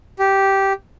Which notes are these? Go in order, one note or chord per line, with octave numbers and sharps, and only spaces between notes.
G4